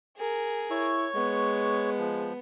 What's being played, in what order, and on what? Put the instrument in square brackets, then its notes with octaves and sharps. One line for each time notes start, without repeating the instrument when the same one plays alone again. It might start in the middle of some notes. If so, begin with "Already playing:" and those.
[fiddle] G#4 A#4
[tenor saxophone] E4 [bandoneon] C#5 C#6
[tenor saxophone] G#3 [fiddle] B3
[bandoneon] F3